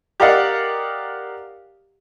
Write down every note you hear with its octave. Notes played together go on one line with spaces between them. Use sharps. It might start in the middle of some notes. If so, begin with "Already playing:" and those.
G4 A#4 D5 D#5 F5 F#5